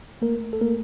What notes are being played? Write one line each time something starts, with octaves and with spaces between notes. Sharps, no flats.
A3 A#3 A#4
A4
A3 A#3 A#4